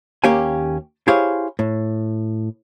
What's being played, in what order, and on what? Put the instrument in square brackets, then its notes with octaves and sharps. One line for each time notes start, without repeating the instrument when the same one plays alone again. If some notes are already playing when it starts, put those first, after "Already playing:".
[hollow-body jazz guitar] D#2 A#3 C#4 G4 F5 G#5
E4 G4 G#4 C5 C#5 F5
A2